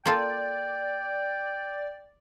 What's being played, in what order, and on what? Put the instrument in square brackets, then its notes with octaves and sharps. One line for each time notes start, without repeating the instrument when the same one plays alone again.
[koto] A#3 F4 A4 [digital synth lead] D5 [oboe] G5